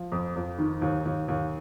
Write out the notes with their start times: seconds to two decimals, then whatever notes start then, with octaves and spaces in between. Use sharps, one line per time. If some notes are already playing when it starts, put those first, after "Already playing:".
Already playing: F3
0.12 F2
0.36 F2
0.58 D#3
0.82 D#2
1.05 D#2
1.28 D#2